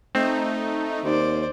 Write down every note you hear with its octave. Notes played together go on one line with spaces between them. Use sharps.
A3 C4 D#4
D#2 C5 D5